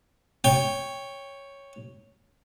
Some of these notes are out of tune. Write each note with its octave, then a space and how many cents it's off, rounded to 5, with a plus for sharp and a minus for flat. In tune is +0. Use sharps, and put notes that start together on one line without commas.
C#5 +0 G5 +15